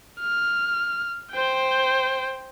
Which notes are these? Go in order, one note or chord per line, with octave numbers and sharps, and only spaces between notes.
F6
C5 G5